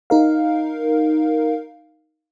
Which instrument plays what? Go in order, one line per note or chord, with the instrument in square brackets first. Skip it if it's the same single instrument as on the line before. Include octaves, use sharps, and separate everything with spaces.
[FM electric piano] D#4 A#4 F5